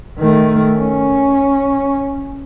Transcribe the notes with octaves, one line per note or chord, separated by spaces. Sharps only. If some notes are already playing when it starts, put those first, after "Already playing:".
D#3 A3
C#4